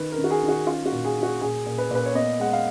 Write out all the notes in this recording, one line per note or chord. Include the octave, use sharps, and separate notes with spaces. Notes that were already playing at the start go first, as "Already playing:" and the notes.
Already playing: D#3 B4
A#4
D#3
F#4
G#4
D#3
F#4
C#4 F4
F#4
A#2
G#4
C#4
F#4
A#2 G#4
A#2
B4
A#2 B4
C#5
B3 D#5
G#3 F#5
F5